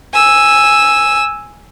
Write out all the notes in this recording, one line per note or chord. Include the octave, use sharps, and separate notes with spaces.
G#5 E6